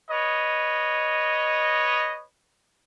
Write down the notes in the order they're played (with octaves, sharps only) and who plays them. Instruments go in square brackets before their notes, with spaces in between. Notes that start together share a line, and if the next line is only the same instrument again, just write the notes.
[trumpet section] B4 C#5 D#5